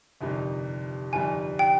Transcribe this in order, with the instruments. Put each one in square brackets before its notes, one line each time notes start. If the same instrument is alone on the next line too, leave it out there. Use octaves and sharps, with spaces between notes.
[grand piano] G1 F2 C3 D#3 G3
[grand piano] G1 F2 D#3 G3 [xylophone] G#5
[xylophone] G5